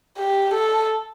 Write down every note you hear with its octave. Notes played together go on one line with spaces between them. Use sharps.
G4
A4